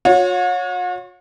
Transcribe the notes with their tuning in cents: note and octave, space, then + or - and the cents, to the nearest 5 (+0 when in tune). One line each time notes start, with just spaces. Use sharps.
F#4 -45 C#5 +0